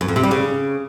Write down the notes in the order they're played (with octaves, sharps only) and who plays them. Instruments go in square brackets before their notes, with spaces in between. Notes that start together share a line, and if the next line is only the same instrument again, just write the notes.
[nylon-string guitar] F#2
F2
C3
G3
C#3